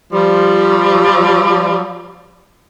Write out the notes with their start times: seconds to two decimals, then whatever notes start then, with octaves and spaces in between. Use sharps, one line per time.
0.12 F3 G3